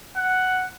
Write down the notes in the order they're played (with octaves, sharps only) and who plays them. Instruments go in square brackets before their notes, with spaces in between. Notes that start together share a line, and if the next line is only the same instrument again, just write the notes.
[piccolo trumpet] F#5